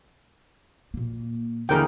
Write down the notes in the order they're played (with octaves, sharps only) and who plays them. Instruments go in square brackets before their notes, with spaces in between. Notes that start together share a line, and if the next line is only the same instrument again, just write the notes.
[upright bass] A#2 A#3
[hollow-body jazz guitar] D#2 D3 E3 [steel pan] G#4 A#4 G5